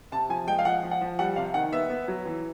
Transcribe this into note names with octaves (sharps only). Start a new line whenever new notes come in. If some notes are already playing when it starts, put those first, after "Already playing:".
C3 A5
F3 G#5
G#3 G5
F5
F3 F#5
F3
F#5
F3
G3 F#5
C3 F5
D#3 F#5
B3 E5
B3
F#3
E3